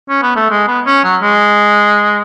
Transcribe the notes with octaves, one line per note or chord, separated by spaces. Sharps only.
C#4
B3
A3
G#3
B3
C#4
F#3
G#3